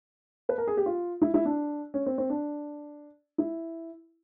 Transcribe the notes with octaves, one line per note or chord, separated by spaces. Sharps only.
B4
A#4
G#4
G4
F4
E4
E4
D4
C#4
C4
C4
D4
E4